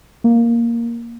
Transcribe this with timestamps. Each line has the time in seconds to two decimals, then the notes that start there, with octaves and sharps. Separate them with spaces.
0.24 A#3